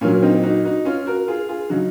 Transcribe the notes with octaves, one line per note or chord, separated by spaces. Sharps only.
A#2 F#3 A#3 C#4
C4 D#4
D#4 F#4
D#4 F#4
C#4 F4
F#4 A#4
F4 G#4
F4 G#4
C#3 F#3 D#4 F#4